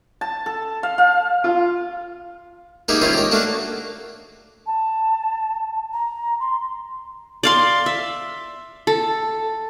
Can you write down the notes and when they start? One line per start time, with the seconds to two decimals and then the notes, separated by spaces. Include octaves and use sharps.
0.21 A5
0.46 A4
0.83 F5
0.98 F5
1.44 F4
2.88 A#3 D#4 G4 G#4 E5
3.01 D#3 C#4 E4 F4 C5
3.13 G4 A#4
3.31 A3 A#3 D4 F#4 F#5
4.67 A5
5.93 A#5
6.40 C6
7.43 D5 F5 C6
7.86 E5
8.87 A4